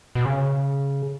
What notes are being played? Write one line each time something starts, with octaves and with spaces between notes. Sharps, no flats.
B2
C#3